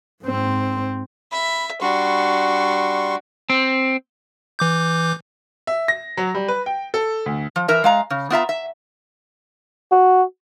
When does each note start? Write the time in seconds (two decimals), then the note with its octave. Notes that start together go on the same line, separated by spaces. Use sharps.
0.23 G#2 C4
1.32 E5 B5
1.81 G3 D4 F#4 C6 C#6
3.50 C4
4.59 E3 D6 G6
5.67 E5
5.88 A#6
6.17 F#3
6.35 G3
6.48 B4
6.66 G5
6.94 A4
7.26 D2
7.56 F3
7.68 E3 A#4 E5
7.84 G#3 F5 A#5
8.10 C#3
8.30 B3 F4 E5 A#5
8.49 E5
9.92 F#4